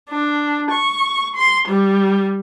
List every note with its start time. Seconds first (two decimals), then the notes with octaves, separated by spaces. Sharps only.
0.10 D4
0.71 C#6
1.36 C6
1.68 G3